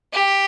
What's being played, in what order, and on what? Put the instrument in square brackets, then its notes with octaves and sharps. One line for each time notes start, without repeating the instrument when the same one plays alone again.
[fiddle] G4